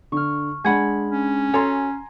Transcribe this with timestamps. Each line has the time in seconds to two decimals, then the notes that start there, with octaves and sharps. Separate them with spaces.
0.12 D3 C#6 F6
0.65 G#3 D4 F#5 G#5 B5 G#6
1.10 C#4
1.54 F#4 A4 C#5 G#5 A#5 C6